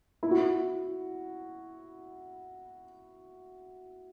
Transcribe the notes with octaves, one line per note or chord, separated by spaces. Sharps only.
E4
F#4
E4